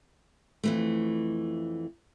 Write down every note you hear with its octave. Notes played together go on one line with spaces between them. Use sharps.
F2 E3 A3